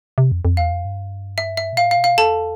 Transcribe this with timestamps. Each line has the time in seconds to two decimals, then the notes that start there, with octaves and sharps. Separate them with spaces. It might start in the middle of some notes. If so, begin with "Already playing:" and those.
0.18 C3
0.32 F2
0.45 F2
0.57 E2 F5
0.71 F2
0.85 G2
1.38 E5
1.57 E5
1.73 B2
1.77 A2 F5
1.91 F5
1.97 B2
2.04 F5
2.17 E2 A4 A5